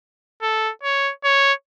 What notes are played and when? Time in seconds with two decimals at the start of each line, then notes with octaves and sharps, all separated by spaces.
0.42 A4
0.83 C#5
1.24 C#5